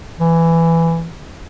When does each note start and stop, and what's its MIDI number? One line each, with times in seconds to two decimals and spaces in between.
0.20 1.09 52